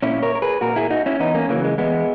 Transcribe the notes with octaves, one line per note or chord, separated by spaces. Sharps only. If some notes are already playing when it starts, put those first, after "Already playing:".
A#2 C#4 E4
A#4 C#5
A#4
G#4 B4
A#2 F#4 A#4
E4 G#4
D#4 F#4
C#4 E4
E2 B3 D#4
A#3 C#4
C#3 E3 F#3 A#3
G#3
E2 G#3 B3